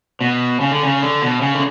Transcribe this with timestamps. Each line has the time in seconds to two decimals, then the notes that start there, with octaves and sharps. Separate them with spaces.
0.21 B2
0.61 C#3
0.72 D3
0.83 C#3
1.01 D3
1.22 B2
1.41 C#3
1.55 D3